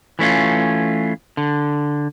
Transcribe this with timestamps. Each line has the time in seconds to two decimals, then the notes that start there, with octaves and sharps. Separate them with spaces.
0.19 E3 A3 C#4 F4
1.37 D3